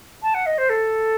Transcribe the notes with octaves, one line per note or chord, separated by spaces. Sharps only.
A5
F#5
D#5
C5
A4